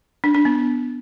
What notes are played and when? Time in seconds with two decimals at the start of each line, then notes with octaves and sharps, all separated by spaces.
0.24 D4
0.35 D4
0.45 B3